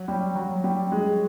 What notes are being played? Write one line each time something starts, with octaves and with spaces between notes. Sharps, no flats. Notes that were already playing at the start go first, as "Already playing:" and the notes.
Already playing: F#3
G3
F#3
G3
G#3